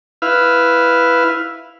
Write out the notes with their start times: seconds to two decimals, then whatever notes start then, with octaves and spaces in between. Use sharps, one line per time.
0.22 E4 B4 F5